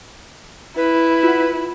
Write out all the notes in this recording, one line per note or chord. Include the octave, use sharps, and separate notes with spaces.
E4 B4
F4 F#5